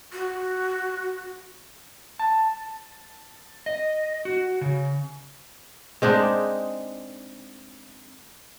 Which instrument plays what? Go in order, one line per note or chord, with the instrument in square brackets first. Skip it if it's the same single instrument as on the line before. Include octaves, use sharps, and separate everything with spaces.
[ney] F#4
[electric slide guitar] A5
D#5
F#4
C#3
[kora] G#3 C4 D4 D#4